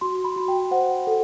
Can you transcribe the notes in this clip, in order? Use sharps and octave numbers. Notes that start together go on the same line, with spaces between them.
F#4 C6
B5
F#4
G5
C5 F#5
A4